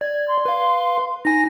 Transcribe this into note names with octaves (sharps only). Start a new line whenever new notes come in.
D5 G#6
C6
B4 F5
D#4 G#5 A#6